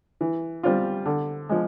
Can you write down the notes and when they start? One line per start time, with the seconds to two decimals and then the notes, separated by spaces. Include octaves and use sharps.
0.21 E3
0.63 G3 C4 F4
1.06 D3
1.49 F3 G#3